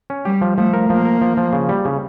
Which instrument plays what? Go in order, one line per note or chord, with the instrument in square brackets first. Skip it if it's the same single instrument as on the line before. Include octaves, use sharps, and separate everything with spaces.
[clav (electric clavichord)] C#4
[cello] G3 [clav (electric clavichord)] G4
[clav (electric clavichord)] F3
[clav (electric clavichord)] F3 [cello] A3
[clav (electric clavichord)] A#4
[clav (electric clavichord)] F3 [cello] A#3
[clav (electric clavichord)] A#4
F3
F3
C#3
G3
C#3